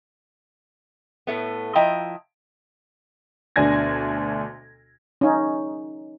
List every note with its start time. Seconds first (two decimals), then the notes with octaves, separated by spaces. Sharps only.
1.27 A2 A3 B3
1.75 F3 E4 D#5 G5 A#5
3.56 D2 B2 D4 G#5 G#6 A#6
5.21 C#4 D#4